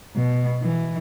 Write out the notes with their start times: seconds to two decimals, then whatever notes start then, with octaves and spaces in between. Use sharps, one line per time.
0.16 B2
0.62 E3